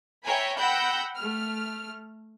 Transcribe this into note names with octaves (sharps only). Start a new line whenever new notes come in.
C#5 E5 G5 G#5 A#5 B5
F#5 G5 B5 E6 G6 A#6
A3 F6